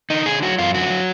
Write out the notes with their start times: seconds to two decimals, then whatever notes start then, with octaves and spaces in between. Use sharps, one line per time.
0.10 D3 D#4
0.26 D3 G#4
0.42 F#3 F#4
0.58 F#2 F4
0.74 D3 F#4
0.90 F#3